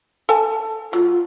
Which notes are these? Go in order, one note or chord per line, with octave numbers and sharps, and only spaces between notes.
A4 G#5 A5
F#3 F4